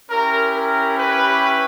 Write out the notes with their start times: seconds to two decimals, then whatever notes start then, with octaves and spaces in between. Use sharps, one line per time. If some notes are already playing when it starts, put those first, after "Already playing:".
0.10 C#4 E4 G4 A#4
0.55 A#4
0.98 B4